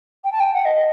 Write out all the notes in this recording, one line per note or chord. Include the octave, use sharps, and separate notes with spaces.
G5
A5
G5
F#5
D#5